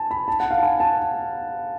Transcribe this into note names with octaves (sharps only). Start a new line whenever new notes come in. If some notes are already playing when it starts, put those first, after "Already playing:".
Already playing: G#5 A5
B5
A5
F#5
F5
A5
G#5
A5